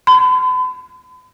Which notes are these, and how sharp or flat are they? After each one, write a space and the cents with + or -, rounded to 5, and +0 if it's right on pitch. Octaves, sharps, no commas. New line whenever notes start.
B5 +45